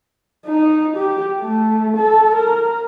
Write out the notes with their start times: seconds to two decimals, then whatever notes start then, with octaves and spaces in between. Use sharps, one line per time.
0.46 D#4
0.97 G4
1.40 A3
1.97 A4
2.35 A#4